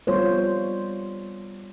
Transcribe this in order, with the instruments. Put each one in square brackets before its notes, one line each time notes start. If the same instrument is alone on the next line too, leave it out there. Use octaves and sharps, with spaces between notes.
[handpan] G3 B3 F4 C5 C#5